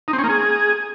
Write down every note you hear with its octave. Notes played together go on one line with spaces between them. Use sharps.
D#4
C4
C#4
A#3
G#4